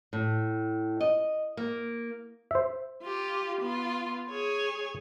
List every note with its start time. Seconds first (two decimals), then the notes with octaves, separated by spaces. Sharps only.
0.13 A2
1.01 D#5
1.57 A#3
2.51 C5 E5
3.03 F4 G4
3.62 B3 F4
4.30 G#4 C#5